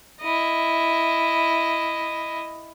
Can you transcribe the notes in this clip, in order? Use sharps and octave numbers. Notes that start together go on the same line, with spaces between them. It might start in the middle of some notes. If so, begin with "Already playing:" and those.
E4 D#5